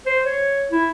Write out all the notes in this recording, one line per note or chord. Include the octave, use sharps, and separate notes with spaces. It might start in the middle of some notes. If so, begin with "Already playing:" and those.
C5
C#5
E4